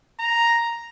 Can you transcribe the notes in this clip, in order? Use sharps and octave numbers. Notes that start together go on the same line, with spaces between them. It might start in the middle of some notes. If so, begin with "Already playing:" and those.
A#5